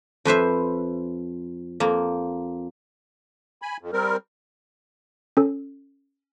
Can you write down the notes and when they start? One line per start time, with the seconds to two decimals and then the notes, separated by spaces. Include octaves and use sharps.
0.25 F2 B4 C5 E5
1.80 F2 A#3
3.62 G#5 B5
3.81 F2
3.93 G3 C4 A#4
5.37 C#4 A4